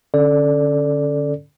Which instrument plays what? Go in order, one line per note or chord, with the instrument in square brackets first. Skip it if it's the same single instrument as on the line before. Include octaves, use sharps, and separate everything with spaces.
[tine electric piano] D3 C#4 A4 D5